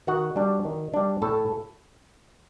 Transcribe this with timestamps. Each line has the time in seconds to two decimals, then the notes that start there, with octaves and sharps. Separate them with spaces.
0.07 D#3 F#4 F#5
0.36 G3 D4
0.65 D#3
0.94 G3 D4
1.22 A2 A4 A5